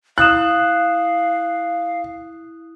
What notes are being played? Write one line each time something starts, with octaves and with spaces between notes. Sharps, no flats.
E4 F5 D#6 F#6 E7